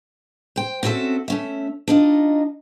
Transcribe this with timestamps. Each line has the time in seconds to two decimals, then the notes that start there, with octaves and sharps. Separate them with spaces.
0.56 C5 G5
0.83 C4 C#4 F#4 A4 E5
1.28 A3 C#4 E5
1.88 D4 D#4 F4 D#5